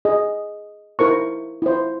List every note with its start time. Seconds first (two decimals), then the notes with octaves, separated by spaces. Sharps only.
0.05 G#4 D#5
0.99 E4 A#4 C5 C#6
1.62 E4 C5